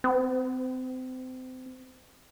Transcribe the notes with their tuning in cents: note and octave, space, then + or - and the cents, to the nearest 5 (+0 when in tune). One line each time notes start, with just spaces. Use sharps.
C4 -30